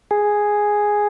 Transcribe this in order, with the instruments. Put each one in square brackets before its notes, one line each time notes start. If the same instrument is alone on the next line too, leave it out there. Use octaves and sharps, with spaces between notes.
[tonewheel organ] G#4